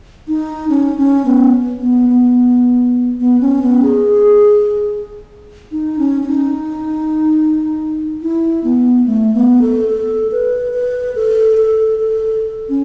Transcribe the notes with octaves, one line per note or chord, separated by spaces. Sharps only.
D#4
C#4
C#4
B3
B3
B3
B3
C#4
B3
G#4
D#4
C#4
C#4
D#4
E4
B3
A3
B3
A4
A4
B4
B4
A4
A4
A4
C#4